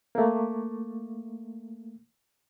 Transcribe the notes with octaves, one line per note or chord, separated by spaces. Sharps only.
A3 A#3